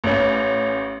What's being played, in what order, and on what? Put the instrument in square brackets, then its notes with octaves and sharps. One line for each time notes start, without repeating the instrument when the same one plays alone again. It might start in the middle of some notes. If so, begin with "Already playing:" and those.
[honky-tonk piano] A1 C#4